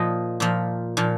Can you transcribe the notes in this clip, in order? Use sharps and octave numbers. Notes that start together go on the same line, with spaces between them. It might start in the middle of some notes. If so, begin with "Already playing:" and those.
Already playing: A#2 F3 D#5
A#2 F3
A#2 F3